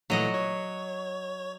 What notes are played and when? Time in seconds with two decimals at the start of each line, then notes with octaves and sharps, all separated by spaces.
0.10 A#2 E3 F#3 A3 D#5 F#5
0.34 C#5